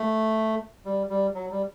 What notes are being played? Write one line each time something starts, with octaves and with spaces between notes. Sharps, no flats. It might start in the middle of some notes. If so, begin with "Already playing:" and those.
Already playing: A3
G3
G3
F#3
G3